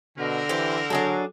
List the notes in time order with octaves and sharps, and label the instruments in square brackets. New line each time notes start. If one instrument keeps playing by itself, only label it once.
[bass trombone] B2 [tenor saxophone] D3 [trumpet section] C4 A#4
[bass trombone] E3 [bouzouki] G4 C5
[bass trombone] F#3 [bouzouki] D4 G#4 A4